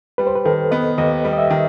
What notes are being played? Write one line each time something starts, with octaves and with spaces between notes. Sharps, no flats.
G3 B4
C5
B4
D#3 A4
B3 D#5
D#2 D#5
G3
D#5
E5
D#3